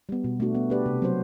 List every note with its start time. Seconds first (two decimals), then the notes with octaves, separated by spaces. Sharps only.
0.09 G3 B3
0.24 B2
0.40 A3 D4 F#4
0.55 B3
0.70 D4 G4 B4 D5
0.86 C3
1.02 F#3 C4 F#4 C5